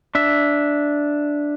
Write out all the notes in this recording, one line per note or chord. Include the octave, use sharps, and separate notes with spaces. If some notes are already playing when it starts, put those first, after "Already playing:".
D4 E5